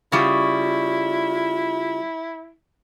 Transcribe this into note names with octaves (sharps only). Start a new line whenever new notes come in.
C#3 G3 E4 F4